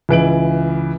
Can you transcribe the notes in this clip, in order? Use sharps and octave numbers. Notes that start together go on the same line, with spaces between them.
C#2 E3 D7 F#7